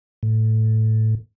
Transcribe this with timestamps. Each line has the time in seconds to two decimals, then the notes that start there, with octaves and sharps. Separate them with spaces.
0.23 A2